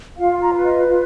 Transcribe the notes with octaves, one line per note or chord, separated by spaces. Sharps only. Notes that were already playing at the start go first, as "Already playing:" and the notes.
F4 F5
A#5
B4
D#5
F4